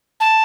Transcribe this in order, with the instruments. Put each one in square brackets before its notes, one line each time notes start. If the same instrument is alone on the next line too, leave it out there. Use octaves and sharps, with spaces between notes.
[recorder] A5